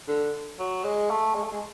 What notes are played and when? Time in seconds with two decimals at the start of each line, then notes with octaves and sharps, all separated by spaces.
0.08 D3
0.59 F#3
0.84 G#3
1.10 A3
1.35 G#3
1.44 A3
1.52 G#3